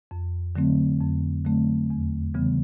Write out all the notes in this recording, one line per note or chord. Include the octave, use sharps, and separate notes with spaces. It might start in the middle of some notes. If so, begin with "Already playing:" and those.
F2
D3 F#3 A3 C4
F2
D3 F#3 A3 C4
E2
C#3 E3 G3 B3